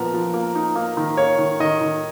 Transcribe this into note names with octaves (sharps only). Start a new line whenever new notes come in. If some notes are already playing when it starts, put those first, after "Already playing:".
Already playing: A#2 F3 B3 A#4
F3
A#3
D#4
A#3
D#3
A#3 C#5
D#3
D#3 D#5
D#3